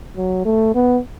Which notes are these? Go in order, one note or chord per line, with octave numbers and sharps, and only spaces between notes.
F#3
A3
B3